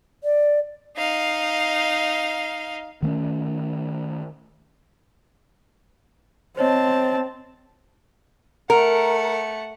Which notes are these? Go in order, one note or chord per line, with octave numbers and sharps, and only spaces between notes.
D5
D#4 F5
D#3 A3 C4 C#4
C4 C5 C#5 D#5 A5
A3 A#4 F#5